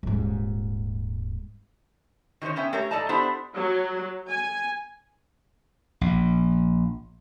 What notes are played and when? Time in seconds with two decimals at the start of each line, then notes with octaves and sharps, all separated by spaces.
0.03 D#1 G#2
2.41 D#3 F#3 D#4 C5 C#5
2.56 B3 C#4 E5 G5
2.73 A3 G4 A#4 C#5
2.91 G#2 A4 D5 D#5 A5 A#5
3.09 B3 D4 E4 G4 A4 C5
3.56 F#3
4.28 G#5
6.01 A#1